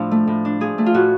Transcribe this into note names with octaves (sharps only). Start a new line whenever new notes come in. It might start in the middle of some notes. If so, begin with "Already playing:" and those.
Already playing: A2 F3 D4 A4
A3
A2
D4
F3 G#4
A3
F4
A2 F#4